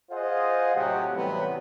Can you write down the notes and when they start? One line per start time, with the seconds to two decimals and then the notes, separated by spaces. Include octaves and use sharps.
0.11 F4 G#4 C5 D#5 F5 F#5
0.76 A2 C3 F#3 G4 C#5 F#5
1.15 A2 C3 E3 F#3 G3 B3